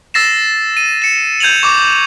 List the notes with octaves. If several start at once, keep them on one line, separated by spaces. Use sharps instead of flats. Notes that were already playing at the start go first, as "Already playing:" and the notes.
E6 A6 A#6 C7 E7
D#7
C#7 E7
G6 G#6 D#7 F7 F#7
C#6 D6